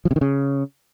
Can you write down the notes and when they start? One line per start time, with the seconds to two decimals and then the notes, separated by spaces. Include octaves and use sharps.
0.05 F3
0.11 C3
0.16 D#3
0.21 C#3